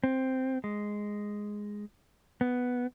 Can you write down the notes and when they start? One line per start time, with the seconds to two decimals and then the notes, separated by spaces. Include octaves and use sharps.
0.04 C4
0.64 G#3
2.41 B3